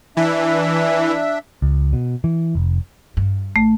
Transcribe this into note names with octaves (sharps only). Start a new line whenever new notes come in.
E3 D4 E5
C#2
B2
E3
F1
G2
A1 A3